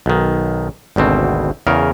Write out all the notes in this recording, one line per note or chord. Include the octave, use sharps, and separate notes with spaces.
B1 D#3
G#1 D2 B2 C4
E2 C#3 A#4